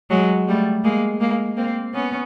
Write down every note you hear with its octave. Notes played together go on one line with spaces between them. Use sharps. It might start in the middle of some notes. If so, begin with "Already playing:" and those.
F#3 G#3
G3 A3
G#3 A#3
G#3 A#3
A#3 C4
B3 C#4